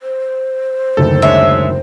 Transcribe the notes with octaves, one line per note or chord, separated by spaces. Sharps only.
C5
F#1 D2 D#3 A4
G#3 D4 C#5 E5